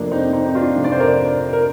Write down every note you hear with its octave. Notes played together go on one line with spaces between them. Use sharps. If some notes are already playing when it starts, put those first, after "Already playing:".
Already playing: F2 C3 F3 A3 A#3 D4
C4 D#4
C4 D#4
D#4
D4 F4
F2 C3 F3 A3
D5
C5
A#4 D5
A#4